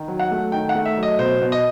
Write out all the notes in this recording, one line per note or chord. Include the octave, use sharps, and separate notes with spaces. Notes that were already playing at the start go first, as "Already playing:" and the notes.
Already playing: D#3
F#3
F#5
A3
D#3 G5
F#5
A3
E5
F#3
D#5
B2 C5
B2
D#5